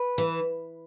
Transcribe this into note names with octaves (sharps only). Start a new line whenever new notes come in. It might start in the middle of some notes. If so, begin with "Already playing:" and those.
Already playing: B4
E3